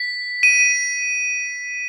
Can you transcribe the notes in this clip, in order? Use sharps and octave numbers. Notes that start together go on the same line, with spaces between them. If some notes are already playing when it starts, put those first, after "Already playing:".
Already playing: B6
D#7